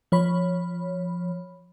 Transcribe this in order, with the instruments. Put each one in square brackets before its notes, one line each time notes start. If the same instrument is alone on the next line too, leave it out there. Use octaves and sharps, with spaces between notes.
[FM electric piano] F3 C#5 B5